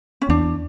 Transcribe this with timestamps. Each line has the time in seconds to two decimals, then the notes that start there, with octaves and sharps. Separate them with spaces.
0.22 C#4
0.29 E2 D4